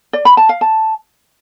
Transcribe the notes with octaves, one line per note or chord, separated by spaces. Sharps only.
D5
B5
A5
F5
A5